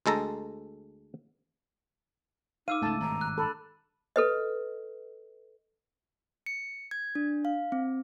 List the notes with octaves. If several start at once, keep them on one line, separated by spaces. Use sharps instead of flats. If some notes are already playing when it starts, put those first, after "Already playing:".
D2 G#3 A4 A#5
D#4 F5 D6 E6 D#7
C#2 G#2 A3 A5
G#1 G2 B2 A#5
F#6
A4 B5
A4 B4 D#5
C#7
G#6
D4
F5
C4